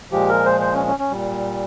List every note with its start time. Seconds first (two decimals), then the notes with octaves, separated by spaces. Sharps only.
0.11 A#2 F3 G#3 G4
0.29 A#4
0.45 C5
0.61 C5
0.74 C#4
0.86 C#4
0.99 C#4
1.11 A#2 G3